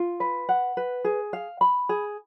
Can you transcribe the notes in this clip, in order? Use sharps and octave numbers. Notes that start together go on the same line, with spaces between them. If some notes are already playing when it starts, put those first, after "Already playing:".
Already playing: F4
B4
F#5
B4
G#4
F5
B5
G#4